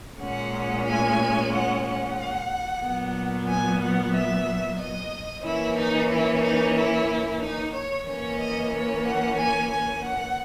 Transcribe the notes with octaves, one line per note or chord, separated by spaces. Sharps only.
A#2 G#3 C#4 F#5
G#5
F#5
F#5
A#2 F#3 B3
G#5
F#5
E5
D#5
E3 A#3 C#4 E4
D#4
E4
D#4
E4
D#4
C#5
E3 A#3 C#4 C#5
D#5
C#5
F#5
G#5
G#5
F#5